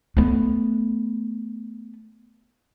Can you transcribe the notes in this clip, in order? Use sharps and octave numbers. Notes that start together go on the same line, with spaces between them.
A3 B3